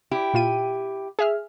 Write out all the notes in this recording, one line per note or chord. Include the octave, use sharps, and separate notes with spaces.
E4 G4
A#2 F4 D#7
G#4 E5 F6